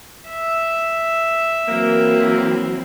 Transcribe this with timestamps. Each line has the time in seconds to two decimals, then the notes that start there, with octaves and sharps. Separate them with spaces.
0.29 E5
1.68 E3 F#3 A#3 C4